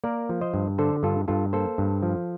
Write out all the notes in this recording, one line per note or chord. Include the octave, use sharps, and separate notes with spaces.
A#3 A#4 D5
F3
C5 D#5
G2
D3 A4 C5
G2 F4 A4
G2 F4 A4
A#3 A4 C5
G2
F3